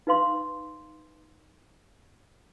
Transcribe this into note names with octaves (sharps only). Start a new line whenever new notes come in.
D#4 B4 F5 C6